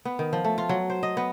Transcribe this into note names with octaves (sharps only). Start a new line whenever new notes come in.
B3
D#3
F3
A3
F4
F#3
C5
D#5
B3